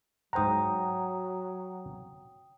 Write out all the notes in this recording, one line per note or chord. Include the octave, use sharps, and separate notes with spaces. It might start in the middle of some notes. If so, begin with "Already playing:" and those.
G#2 F#3 C5 F#5 G5 A#5 D#6